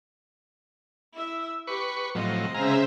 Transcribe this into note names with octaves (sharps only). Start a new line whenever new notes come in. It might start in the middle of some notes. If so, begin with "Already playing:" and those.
E4 E5
G4 B4 C#6
A2 F3 F#3 C4 D#5
C#3 G#3 C5 E5 F5 A#5